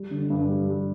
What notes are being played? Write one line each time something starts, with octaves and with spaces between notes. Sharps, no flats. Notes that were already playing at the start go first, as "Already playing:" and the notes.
Already playing: G3
D3
G2
G3
G3